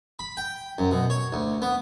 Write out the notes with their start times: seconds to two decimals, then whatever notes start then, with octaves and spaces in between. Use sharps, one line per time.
0.19 B5
0.37 G5
0.78 F#2
0.91 B2
1.10 C#5
1.33 D2
1.62 B3